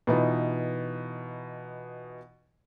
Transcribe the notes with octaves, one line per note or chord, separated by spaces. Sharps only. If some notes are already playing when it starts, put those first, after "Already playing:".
B2 E3 D#4 F4